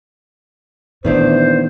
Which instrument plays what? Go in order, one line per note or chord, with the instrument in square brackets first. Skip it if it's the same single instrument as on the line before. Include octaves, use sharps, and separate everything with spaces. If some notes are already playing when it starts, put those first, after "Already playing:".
[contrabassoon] E2 [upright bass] A#2 [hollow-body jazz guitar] D#3 A3 D4 [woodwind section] C5